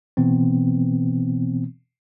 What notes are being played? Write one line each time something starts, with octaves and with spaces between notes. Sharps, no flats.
B2 E3 B3 C4